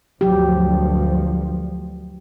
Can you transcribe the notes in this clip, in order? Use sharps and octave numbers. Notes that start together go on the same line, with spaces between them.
D2 G2 F3 F#3 G4